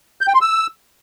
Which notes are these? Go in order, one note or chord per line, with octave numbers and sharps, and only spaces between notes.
G6
G5
C6
E6